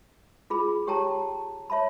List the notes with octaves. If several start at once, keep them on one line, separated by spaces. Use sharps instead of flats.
F4 G#4 B5
G4 C#5 G5 A5 A#5
C#5 E5 A5 B5